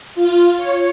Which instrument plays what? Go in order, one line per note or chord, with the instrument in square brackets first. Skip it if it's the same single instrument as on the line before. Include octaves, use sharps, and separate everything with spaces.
[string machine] F4
C#5